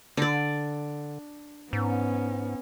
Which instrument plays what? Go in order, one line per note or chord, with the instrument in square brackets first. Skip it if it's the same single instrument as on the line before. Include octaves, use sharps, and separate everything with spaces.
[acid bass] D3 [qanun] D4 D5
[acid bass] G#2 [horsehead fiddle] B3 C#4